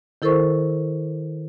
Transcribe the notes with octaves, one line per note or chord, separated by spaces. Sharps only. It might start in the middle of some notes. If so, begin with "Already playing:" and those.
D#3 E4 A4 A#4 C5 C#6